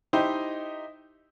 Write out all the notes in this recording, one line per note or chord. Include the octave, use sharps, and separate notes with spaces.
D#4 E4 G4 C5 D#5